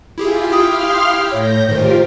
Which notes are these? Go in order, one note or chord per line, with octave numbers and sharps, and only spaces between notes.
E4 F4 G4 G#4
E4 G4 F5 G5 C6 D#6 F6
A2 C#5 G6 A#6
G#2 D#3 F4 G4 A#4 C5